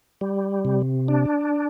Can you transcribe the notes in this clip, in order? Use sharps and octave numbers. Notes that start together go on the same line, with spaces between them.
G3
C3
D4